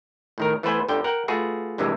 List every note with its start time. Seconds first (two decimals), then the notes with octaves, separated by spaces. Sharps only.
0.38 A2 D#3 A#4
0.63 E3 A3 B3 B4 C5 G#5
0.89 G1 D3 G5
1.04 A#4 F#5 G5
1.28 A3 F4 F#4 G#4 B4
1.78 A#1 G2 C3 E3 G#3